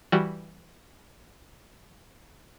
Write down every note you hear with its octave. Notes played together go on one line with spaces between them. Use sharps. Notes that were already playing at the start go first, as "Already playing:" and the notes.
E3 G3 F#4